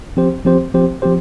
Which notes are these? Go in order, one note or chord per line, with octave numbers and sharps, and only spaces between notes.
F3 C4 G4 C5
F3 C4 G4 C5
F3 C4 G4 C5
F3 C4 G4 C5